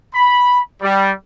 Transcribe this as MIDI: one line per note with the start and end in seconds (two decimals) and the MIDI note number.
0.14 0.60 83
0.82 1.12 55